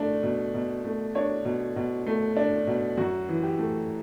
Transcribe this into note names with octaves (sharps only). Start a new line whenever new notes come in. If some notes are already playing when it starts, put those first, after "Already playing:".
Already playing: A3 D4
B2
B2
A3
D4 C#5
B2
B2
A3
D4
B2
F#2 F#4
E3
G4
A3